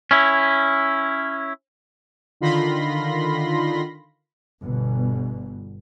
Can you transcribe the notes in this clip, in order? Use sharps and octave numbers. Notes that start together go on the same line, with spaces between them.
C#4 E4
D3 D#3 F4 B5 C6 A#6
G1 B2